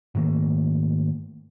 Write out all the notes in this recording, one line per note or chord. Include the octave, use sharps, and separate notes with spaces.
G#2 D#3 A3 A#3